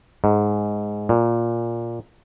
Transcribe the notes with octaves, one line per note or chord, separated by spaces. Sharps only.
G#2
A#2